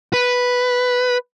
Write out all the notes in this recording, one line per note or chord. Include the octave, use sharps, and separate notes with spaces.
B4